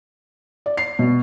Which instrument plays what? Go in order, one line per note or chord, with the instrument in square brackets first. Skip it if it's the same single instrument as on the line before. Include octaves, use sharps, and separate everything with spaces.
[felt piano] D5
C7
B2